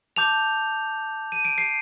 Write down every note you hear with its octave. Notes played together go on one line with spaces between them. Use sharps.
A5 D6 G6 F7
D#7
D7
C7